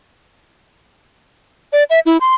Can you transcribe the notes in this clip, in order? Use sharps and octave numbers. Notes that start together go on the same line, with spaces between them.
D5
E5
E4
C6